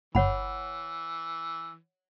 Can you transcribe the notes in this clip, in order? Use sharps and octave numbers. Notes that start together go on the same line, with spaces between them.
G1 E3 C#5 F#5 B5